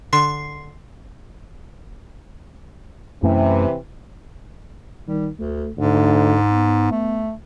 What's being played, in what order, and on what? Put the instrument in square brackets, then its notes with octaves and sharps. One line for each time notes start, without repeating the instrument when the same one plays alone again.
[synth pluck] D3 [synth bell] C6 C7
[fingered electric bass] F#2 A3 C#4 [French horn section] C3 E3
[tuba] D#3 [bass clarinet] G3
[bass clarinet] D2 [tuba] A3
[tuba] D2 [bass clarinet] G#2
[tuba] B3
[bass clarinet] A3